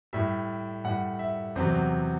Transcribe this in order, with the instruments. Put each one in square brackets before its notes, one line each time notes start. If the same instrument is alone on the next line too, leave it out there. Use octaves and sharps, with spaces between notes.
[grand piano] A2 G3 E5
A2 G3 F#5
E5
E2 C3 F#3 C5